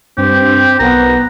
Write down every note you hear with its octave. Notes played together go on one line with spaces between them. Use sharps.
G2 C4 G4
B1 B3 A#4 A#5